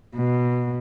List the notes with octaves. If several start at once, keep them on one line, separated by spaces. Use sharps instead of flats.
B2